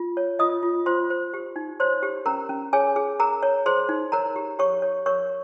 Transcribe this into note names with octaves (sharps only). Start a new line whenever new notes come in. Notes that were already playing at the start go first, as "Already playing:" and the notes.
Already playing: F4
C#5
F4 D#5 D#6
F4
F4 C5 C6
C5
G4
D#4
C5 C#5 C6
G4
C#4 A#4 A#5
C#4
G#4 C#5 G#5
G#4
G#4 A#4 A#5
C#5
G#4 C5 C6
D#4
A#4 C#5 A#5
G4
G4 C#5 C#6
C#5
A#4 C#5 C#6